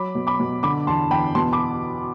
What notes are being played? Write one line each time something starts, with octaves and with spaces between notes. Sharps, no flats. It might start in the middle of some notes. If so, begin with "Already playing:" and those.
Already playing: F#3 B5 D6
B2
B5 D6
B2
D3 B5 D6
E2 A5 C6
E2 G5 B5
B2 A5 C6
B5 D6